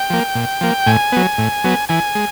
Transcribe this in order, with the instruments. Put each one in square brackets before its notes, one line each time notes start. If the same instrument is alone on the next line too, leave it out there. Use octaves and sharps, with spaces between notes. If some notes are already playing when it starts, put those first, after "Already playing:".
Already playing: [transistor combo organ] G5
F3 A#3
A#2
F3 A#3
A2 G#5
F#3 B3
A2
F#3 B3
E3 G#5
G#3